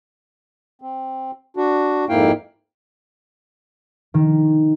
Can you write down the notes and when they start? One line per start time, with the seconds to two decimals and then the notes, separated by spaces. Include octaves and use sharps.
0.82 C4
1.57 D4 F#4
2.09 F2 G#2 A#3 E4 F5 G5
4.14 D#3